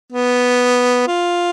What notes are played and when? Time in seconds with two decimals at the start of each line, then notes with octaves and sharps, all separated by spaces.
0.12 B3
1.08 F4